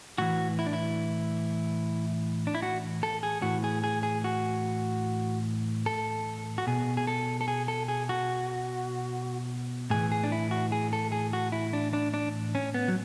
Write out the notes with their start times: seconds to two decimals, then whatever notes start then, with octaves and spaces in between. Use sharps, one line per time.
0.18 A2 E3 F#4
0.59 E4
0.66 D4
0.73 E4
2.47 D4
2.55 E4
2.63 F#4
3.03 A4
3.23 G#4
3.42 A2 E3 F#4
3.64 G#4
3.84 G#4
4.03 G#4
4.24 F#4
5.86 A4
6.58 F#4
6.67 B2 G#4
6.97 G#4
7.07 A4
7.41 A4
7.48 G#4
7.68 A4
7.88 G#4
8.09 F#4
9.90 A2 E3 G#4
10.12 G#4
10.24 D4
10.32 E4
10.51 F#4
10.72 G#4
10.93 A4
11.12 G#4
11.33 F#4
11.52 E4
11.73 D4
11.93 D4
12.14 D4
12.55 C#4
12.74 B3
12.88 F#3